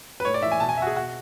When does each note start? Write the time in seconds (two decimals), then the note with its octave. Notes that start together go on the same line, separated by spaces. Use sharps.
0.20 B4
0.25 A2 C#5
0.34 D5
0.42 E3 E5
0.52 G#5
0.60 B2 A5
0.69 G#5
0.78 E5
0.82 F#4
0.87 G#4
0.96 B2 F#4